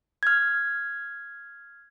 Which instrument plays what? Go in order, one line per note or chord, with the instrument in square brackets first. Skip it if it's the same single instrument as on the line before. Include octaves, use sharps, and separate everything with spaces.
[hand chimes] F6 G#6